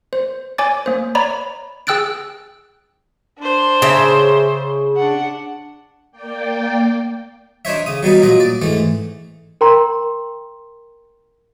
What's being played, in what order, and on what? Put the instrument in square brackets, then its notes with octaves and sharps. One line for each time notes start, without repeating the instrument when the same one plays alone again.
[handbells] C5
C#5 G#5 D6 A6
A#3 C5
C#5 D5 A#5 B5
G#4 G5 E6 F#6 A6 D7
[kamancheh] D4 C5
[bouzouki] C#3 E5
[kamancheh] D4 F#5
[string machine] A#3 D5 G5
[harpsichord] D4 D#4 C5 C#5 E5
C#3 D#6
F#3 G3 B3 D#4
A#2 F#3 D#5
D5
G#2 E3 A3
[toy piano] A#4 G5 A#5 C6